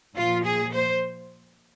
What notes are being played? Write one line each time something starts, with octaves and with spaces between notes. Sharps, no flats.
A#2 F3 F4
G#4
C5